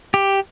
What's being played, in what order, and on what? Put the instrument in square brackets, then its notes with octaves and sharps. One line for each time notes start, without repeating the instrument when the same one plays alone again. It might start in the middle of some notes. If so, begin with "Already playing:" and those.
[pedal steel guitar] G4